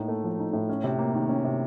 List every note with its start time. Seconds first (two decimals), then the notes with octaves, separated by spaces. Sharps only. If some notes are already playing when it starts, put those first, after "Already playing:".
Already playing: A2 A#3 D#4
0.08 A3
0.24 F3
0.39 D#4
0.53 A2
0.69 C#4
0.84 C3
0.99 A#3
1.15 D#3
1.29 C#4
1.44 C3